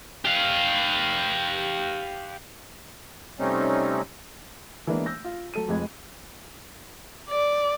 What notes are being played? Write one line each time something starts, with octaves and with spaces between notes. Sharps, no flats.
G4 F5
C3 G3 A3 C4 C#4 D#4
E3 G#3 A#3 B3 D4
E6 G6 A#6
F4
F#3 A4 D#7
F1 F2 G#3 G#6
D5